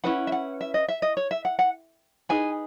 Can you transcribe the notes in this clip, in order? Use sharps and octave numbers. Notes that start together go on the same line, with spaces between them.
C#4 E4 B4 F#5
E5
F#5
E5
D#5
E5
D#5
C#5
E5
F#5
F#5
D#4 G#4 B4 G#5